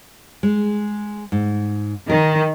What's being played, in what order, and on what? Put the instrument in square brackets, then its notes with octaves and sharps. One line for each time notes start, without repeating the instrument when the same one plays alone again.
[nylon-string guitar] G#3
G#2
[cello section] D#3 [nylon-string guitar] A#4